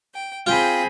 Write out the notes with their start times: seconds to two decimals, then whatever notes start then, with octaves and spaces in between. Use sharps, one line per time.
0.14 G5
0.47 C4 F4 G#4 G5 B5